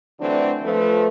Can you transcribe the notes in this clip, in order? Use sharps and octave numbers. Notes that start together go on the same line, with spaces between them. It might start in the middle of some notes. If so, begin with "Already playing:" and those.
D3 E3 F#3 A3 C4 D4
F3 A3 B4